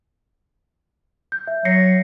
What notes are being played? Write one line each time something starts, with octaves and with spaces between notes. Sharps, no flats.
G6
E5
F#3 A#6 C7 C#7